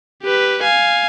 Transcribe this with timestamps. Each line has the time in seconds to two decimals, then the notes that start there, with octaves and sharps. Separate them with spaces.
0.23 G4 B4
0.63 F5 G#5